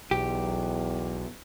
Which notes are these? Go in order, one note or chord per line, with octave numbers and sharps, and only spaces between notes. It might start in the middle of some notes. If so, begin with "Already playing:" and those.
B1 E2 G4